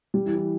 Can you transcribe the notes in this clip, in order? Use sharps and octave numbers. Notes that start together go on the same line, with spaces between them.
G3
E3
E3